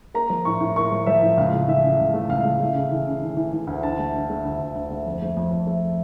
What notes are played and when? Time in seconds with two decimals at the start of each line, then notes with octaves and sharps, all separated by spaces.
0.14 A#3 A#5
0.30 F3
0.45 A2 C#6
0.61 A2
0.76 A#3 C#6
0.92 F3
1.06 F3 E5
1.22 A2
1.37 C#2 F5
1.53 A3
1.68 E3 E5
1.83 C#3
1.98 C#2 F5
2.14 A3
2.29 C#2 F5
2.45 A3
2.60 A3
2.75 C#3
2.91 E3
3.07 C#3
3.22 E3
3.37 E3
3.53 E3
3.67 D2
3.83 D3 A5
3.99 A3
4.14 D3
4.30 A3
4.45 D2
4.59 D2
4.75 D2
4.90 A3
5.06 F2
5.22 A3
5.37 F2
5.51 F2
5.67 A3